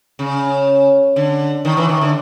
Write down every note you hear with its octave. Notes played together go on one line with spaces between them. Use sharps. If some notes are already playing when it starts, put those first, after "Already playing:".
C#3
D3
D#3
E3
D#3
D3